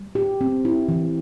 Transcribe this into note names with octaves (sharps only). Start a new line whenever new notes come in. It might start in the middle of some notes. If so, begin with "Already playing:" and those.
Already playing: G3
G4
C4
E4
E3